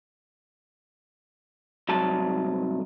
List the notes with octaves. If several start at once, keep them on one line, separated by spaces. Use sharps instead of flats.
C2 G#2 F#3 A5